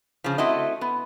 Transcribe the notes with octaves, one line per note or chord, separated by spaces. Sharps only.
C#3 F3
A3 C4 E4 F#4 D#5
B3